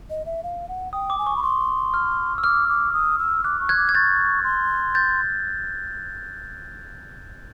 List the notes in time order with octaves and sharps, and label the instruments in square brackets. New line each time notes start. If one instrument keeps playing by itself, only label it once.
[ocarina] D#5
E5
F5
F#5
[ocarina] G5 [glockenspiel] D#6
[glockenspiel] D6
[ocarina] G#5
[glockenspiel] C#6
[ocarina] B5
[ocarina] C6 [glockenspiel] C#6
[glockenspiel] F6
E6
[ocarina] D6 [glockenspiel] F6
[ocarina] D6
D#6
E6
[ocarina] D6 [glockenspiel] F#6
[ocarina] C#6
[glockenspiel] F#6 G#6
[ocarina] D6
[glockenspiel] G#6
[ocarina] C#6 [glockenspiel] G6 A6
[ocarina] C6
[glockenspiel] G6 A6